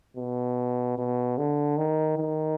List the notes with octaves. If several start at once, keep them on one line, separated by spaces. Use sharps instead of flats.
B2
B2
D3
D#3
D#3